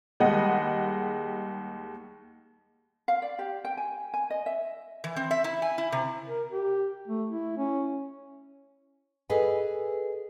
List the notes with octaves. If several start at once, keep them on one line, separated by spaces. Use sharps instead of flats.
D#2 G3 G#3 D#5 F#5
F5
D5
G4
G5
G#5
G#5
D#5
E5
E3
C4
E5
E4
G#5
E4
C3
A#4
G4
A3
E4
C#4
G#4 A4 B4 D#5 F#5 G#5